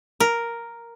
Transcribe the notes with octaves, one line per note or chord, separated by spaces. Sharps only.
A#4